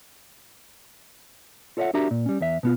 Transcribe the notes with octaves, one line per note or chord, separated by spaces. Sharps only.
F4 A4 C#5 D#5 E5 F#5
D4 F#4 G4 A#4 E5 A#5
A#2
G3 C#4
E2 E5
B2 B3 F4